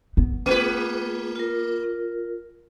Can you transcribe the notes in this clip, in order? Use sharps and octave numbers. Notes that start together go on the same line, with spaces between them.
B3
A3 A#3 F4 G#4 B4
F4 A#4